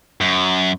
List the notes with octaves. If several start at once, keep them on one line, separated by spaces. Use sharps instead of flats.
F#2